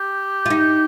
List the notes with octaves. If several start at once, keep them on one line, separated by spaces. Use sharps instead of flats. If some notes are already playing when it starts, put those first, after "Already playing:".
Already playing: G4
F4
D#4